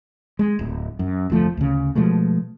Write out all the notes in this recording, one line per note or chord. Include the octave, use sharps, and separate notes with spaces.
G#3
D1
F#2
F1 D2 F3 A3
D2 C#3
B2 F3 G#3 A3